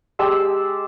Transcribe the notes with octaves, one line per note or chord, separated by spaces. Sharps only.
G#3 G4 A5 E6